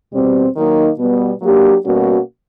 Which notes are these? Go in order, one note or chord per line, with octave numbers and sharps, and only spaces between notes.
E2 B2 G3 C4
D#3 F#3 A#3 D#4
B2 G3 B3
F#3 A#3 D4 G4
B2 G3 A#3 C#4 F#4